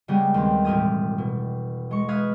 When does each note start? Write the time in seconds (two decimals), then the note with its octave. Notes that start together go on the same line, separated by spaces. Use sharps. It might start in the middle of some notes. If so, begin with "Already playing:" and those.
0.08 C#3 G3 G#3 B3 G4 G#4
0.34 D#2 C4
0.64 E1 A2 G4 A#4 D#6 G#6
1.18 B2
1.91 G#3 C#6
2.08 B4 F5 D#6 G#6